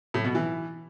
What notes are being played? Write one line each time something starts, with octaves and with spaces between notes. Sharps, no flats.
A2
B2
E3